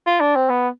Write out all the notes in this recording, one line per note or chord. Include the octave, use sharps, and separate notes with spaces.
F4
D4
C4
B3